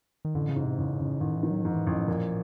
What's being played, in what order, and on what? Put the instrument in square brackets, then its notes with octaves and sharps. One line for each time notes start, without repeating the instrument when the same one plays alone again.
[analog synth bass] D#3
[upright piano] A1 [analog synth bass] D3
[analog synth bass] C#3
[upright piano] G#2
[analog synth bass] C3
[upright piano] A1 [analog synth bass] C#3
[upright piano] A1
[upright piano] A1 [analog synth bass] D#3
[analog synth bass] E3
[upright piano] D#3
[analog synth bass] F#3
[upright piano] G#2 [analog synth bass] F3
[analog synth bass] E3
[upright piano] A1 [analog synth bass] F3
[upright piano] A#2